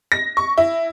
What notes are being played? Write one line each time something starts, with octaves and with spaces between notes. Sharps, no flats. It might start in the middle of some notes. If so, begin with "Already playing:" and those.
A#6
C#6
E4